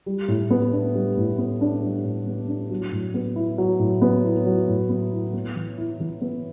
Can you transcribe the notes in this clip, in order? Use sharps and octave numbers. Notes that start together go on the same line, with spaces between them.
G3
A2
B3
D4
G3
A2
B3
D4
G3
A2
B3
D4
F#3
A2
B3
E4
F#3
A2
B3
E4
F#3
A2
B3
E4
B3
E3
E4
E3
B3